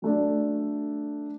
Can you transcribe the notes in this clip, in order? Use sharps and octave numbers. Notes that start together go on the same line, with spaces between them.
F#3 A3 D4